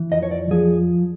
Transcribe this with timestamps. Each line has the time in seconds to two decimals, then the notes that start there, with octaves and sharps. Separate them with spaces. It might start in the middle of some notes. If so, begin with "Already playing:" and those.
Already playing: E3
0.12 F2 D#5
0.22 C#5
0.31 D5
0.51 F3 G#4